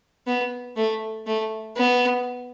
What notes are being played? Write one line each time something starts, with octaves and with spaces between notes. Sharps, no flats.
B3
A3
A3
B3